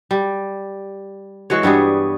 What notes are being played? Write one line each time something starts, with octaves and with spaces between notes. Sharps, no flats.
G3
E3 G#3 F#4 C#5
G2 G3 B3 G#4